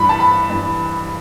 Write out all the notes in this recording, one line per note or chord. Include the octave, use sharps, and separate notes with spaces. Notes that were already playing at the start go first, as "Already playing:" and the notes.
Already playing: G2 E3 B5
A5
B5
G2 E3